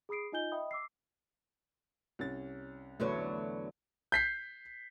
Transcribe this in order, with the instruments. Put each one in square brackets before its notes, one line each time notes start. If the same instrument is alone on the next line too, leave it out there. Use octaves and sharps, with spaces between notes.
[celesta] G#4 B5 D#6 C7 D7
D#4 F4 D#5 G#5 G6 G7
D#5 E5 G5 B5 D#6
D6 E6 C7
[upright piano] C2 C#4 A6
[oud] E2 D3 F#3 [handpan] A3 B4 C#5
[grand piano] G6 B6 C7